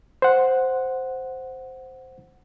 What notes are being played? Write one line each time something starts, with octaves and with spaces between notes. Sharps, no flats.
C5 F#5